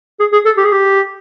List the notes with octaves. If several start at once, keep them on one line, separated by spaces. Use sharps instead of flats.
G#4
G#4
A4
G4
G#4
G4